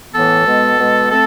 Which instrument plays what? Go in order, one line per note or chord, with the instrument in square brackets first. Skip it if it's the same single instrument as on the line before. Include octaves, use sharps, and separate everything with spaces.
[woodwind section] A2 E3 B3 A4
B2 G#3 B3
B2 G#3 B3
A3 C4 A4